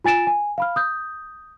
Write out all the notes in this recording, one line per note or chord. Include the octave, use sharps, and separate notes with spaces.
F4 G#5 A6 D7 E7
G#5
F5 B5 F6
D#6 G6